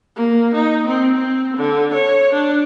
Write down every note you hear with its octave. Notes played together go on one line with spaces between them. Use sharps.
A#3
D#4
C4
C4
D3
C#5
D4